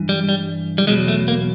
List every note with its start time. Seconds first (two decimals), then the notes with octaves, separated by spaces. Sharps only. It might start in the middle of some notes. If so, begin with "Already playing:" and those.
Already playing: G2 E3
0.09 G3
0.29 G3
0.78 G3
0.87 E2 B2 F#3 G#3
1.08 A3
1.28 A#3